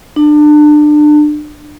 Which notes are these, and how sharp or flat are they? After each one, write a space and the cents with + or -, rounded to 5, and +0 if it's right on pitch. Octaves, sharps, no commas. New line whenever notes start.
D4 +30